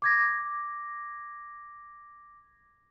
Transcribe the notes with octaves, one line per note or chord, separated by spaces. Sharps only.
D6 G#6 A#6